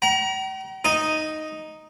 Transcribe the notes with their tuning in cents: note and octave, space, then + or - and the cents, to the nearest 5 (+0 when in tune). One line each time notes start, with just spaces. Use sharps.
G5 -45 A#5 +30
D#4 +0 D#5 +0